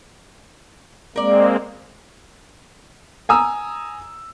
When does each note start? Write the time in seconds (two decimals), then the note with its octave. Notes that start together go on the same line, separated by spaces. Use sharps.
1.16 G#3 A#3 C4 A#4 D5
3.29 G#5 A#5 D#6 E6